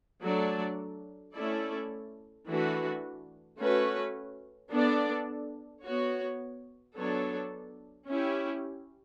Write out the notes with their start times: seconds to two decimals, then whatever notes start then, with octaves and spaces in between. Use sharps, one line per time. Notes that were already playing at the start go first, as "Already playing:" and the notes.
0.21 F#3 A3 D4 A4 D5
1.33 A3 C#4 E4 A4 D5
2.46 E3 A3 D4 F#4 B4
3.59 A3 C#4 F#4 B4
4.71 B3 D4 A4 D5
5.83 B3 F#4 C#5
6.96 F#3 B3 D4 A4 C#5
8.08 C#4 E4 G4